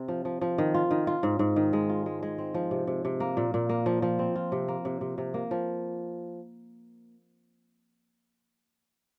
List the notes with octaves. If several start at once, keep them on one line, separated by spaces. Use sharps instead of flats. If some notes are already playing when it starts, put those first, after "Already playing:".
Already playing: C3 C4
F3
F3
F3
D#3
F4
D#3
F4
G#2
G#2
D#3
G#3
F4
G#3
G#3
C4
F3
C3
C3
C3
A#3
A#2
A#2
A#3
F3
F3
C4
F4
C3
A#3
C3
C3
C3
A#3
F3